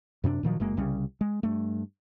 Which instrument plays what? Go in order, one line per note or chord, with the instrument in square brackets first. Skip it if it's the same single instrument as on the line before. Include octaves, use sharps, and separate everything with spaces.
[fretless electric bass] F#2 C3 C4 D4
A#2 D#3 F3 F#3
F#1 F#2 G#3 A#3
C2 C#3 G3 C#4
G#3
G2 A3